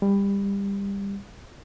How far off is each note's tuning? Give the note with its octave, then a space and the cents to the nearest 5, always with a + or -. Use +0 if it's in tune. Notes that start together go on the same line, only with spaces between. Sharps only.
G3 +25